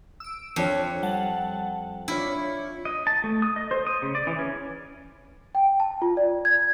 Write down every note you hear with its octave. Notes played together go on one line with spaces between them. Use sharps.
E6 D7
F2 D4 F4 C#5
G3 F#5 A5
D4 E4 F4 C#5
D#5
A5
A3
D#6
D#5
C5
D#6
C#3
D5
E3
C#4
G5
A5
F4
D5
G#6